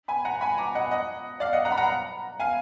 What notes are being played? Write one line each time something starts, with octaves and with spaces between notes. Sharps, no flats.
G#5 B5
F#5 A#5
G#5 B5
A#5 D6
D#5 F#5
D#5 F#5
D5 F5
D#5 F#5
F#5 A#5
B5
F#5 A#5
F5 G#5